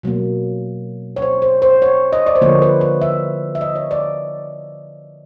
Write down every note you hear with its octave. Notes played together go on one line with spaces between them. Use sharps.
B2 F#3 A#3
C#5
C5
C5
C5
C#5
D#5
D5
C5
D3 F3 A#3 C#5
B4
B4
E5
E5
D#5
C#5
D5